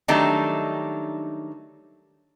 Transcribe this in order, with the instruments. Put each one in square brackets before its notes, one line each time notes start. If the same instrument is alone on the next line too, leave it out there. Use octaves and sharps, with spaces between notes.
[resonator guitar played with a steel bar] D#3 F#3 G3 A3 D4 D#4